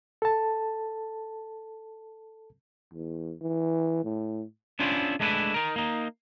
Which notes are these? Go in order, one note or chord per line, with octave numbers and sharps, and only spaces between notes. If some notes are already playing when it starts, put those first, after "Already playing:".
A4 A5
E2
E3
A2
B3 C#4 D4 E4 F4 C5
G#3 A3 D4 E4 B4
D#4 A#4
A#3 D#4